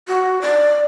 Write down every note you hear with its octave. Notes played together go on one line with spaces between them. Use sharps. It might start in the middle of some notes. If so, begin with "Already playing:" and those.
F#4
D5